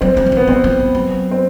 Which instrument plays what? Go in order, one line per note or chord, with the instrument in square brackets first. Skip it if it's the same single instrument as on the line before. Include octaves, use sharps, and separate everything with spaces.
[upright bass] F#3 [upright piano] C4
[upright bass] F#3
D#3
E3
[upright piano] B3
[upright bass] F3 [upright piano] C4
[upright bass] F3
F#3
F#3
[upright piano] C4